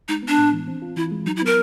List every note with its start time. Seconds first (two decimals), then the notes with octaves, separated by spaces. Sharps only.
0.08 G#3 D#4
0.23 B3
0.28 D4
0.38 A2
0.53 E3
0.68 C4
0.82 F4
0.96 E3 E4
1.11 G#3
1.26 F#3 D#4
1.36 E4
1.42 B3 A#4